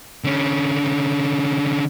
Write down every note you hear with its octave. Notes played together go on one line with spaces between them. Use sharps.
D3 C#4